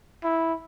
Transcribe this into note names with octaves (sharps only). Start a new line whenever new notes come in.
E4